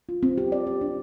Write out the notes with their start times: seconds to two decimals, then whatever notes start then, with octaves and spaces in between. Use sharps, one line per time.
0.09 F4
0.23 C4
0.38 G4
0.52 D5
0.67 G4
0.81 D4